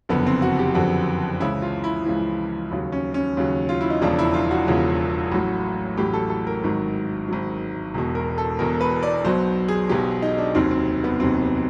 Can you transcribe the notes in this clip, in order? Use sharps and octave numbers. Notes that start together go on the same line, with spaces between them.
F#1 F2 D3 B3
C4
F#4
G4
F#1 F2 D3 F#4
C#2 C#3 E3 E4
F4
E4
C#2 C#3 E3
D#2 C#3 F#3
C#4
C#4
D#2 C#3 F#3
F4
E4
D#4
E1 E2 C#3 F3 D4
E4
F4
F#4
E1 E2 C#3 F3
A1 A2 F#3
A1 A2 F#3 G4
A4
A4
A#4
G#1 G#2 D#3 F#3
G#1 G#2 D#3 F#3
E1 E2 B2
A#4
A4
E1 E2 B2 A#4
B4
D5
B1 B2 F#3 C5
G#4
B1 B2 F#3 G4
D#4
D4
F1 D#2 D#3 F#3 C4
C4
B3
F1 D#2 D#3 F#3 C4
B3